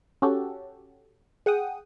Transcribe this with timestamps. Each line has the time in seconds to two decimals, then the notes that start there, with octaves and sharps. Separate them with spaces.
0.22 C#4 F#4 G4 A4
1.46 G#4 F#5 G5 D#6